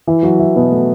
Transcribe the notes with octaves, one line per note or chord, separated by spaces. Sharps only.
E3 E4
F#3 F#4
E3 E4
B2 B3
A3